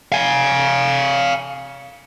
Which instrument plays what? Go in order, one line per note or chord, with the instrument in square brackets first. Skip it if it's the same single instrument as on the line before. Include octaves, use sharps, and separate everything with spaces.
[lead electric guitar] F5 G#5